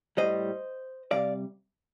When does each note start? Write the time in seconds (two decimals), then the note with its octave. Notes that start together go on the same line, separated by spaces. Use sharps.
0.17 A2 G3 C5 D#5
1.11 C3 G3 D5 F5